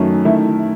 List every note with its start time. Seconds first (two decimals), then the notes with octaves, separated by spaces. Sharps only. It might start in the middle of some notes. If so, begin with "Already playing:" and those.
Already playing: F#2 D#3 F#3 A3 C#4
0.25 D#3 A3 E4